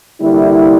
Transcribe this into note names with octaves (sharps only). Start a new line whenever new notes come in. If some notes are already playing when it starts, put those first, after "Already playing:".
D3 G3 A#3 E4